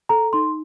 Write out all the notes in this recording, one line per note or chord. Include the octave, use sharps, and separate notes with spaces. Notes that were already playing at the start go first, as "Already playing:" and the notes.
A4 A#5
D#4 C6